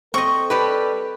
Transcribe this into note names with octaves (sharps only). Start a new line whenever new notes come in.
C4 A4 D#5 C#6
G3 G4 B4